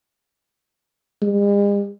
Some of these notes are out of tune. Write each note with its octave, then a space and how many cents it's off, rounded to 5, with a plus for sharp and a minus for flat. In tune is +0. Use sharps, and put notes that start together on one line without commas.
G#3 -45